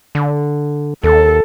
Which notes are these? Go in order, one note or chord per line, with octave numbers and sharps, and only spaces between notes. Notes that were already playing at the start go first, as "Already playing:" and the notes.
D3
D#2 A4